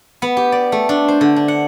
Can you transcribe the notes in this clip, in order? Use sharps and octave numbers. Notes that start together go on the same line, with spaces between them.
B3
G4
D5
A3
D4
C5
D3
D4
F#5